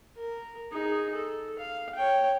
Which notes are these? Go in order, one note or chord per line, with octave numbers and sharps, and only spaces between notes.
A#4
D#4 G#4
A4
F5
C#5 G5